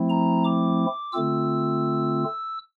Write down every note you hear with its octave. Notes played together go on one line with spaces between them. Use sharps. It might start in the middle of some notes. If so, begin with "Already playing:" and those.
Already playing: F3 A3 C4 E4
A#5
D6
D3 A3 C4 F4 E6